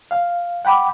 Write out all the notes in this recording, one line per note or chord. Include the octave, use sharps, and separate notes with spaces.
F5
F#5 G5 B5 D6